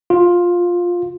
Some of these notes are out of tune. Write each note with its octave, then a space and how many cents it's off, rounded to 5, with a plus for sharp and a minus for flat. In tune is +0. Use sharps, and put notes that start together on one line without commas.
F4 +10